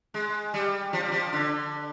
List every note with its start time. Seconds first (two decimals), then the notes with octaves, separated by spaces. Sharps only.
0.14 G#3
0.54 G3
0.93 F3
1.03 G3
1.12 F3
1.33 D3